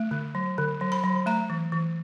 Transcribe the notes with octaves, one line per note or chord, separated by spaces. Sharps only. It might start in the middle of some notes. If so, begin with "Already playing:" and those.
Already playing: A3
D3
F#3
D3
F#3
B5
F#3
A3 A#5
E3
E3